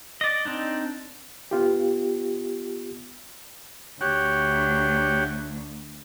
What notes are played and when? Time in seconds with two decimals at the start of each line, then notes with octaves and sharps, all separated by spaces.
0.21 D5 D#5
0.45 C4 D4 D#4
1.51 B3 F4 G4
4.01 D2 F#4 G4 C#5